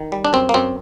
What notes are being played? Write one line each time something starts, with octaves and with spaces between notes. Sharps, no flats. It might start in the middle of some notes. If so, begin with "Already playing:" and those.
Already playing: D#3
G3
D4
F#2 C4
A#3
F#2 C4